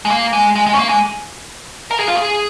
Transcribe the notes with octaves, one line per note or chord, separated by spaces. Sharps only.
G#3
A#3
G#3
G#3
G#3
C#4
A#3
G#3
A#4
G#4
F4
G#4